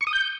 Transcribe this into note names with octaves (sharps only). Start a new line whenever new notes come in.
C#6
D#6
G6